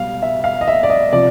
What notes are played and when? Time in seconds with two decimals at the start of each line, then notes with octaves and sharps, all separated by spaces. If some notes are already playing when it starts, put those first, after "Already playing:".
Already playing: B2 G3 F5
0.22 E5
0.44 F5
0.61 D#5
0.68 E5
0.83 D5
0.90 D#5
1.12 C3 F3 D5